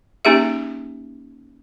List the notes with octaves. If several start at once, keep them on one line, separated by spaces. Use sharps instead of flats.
A#3 C#4 D#4 G4 G#4 E5